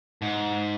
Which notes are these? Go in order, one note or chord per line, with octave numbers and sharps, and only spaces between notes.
G#2